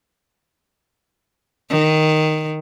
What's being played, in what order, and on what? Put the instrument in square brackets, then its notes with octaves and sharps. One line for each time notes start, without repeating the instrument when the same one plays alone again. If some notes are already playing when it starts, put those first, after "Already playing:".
[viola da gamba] D#3